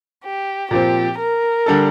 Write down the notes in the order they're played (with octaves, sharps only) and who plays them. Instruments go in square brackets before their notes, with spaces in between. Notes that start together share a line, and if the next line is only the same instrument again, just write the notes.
[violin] G4
[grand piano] A#2 F3 C4 [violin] G4
[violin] A#4
[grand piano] D3 G3 D4 A4